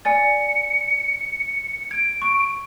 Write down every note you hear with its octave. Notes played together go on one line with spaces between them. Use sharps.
D5 G#5 A6 C#7
G#6 D7
C#6